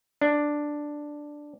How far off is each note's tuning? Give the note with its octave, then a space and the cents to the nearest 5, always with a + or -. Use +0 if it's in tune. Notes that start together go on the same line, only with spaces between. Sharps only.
D4 +5